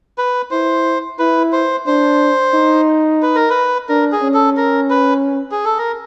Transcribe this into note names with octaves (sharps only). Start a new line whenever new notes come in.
B4
E4 C5
E4 B4
C5
D4 C5
D#4
B4
A#4
B4
D4 A#4
G#4
C#4
A4
A#4
B4
G#4
A4
A#4